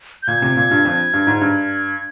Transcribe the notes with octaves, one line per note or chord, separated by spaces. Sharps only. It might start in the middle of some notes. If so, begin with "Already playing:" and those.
G6
A#2 G#6
C3
A#2
G2
F2
G2
G#2
G2